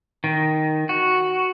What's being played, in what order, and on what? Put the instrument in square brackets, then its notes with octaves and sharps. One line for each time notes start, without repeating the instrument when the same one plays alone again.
[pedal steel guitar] D#3
F#4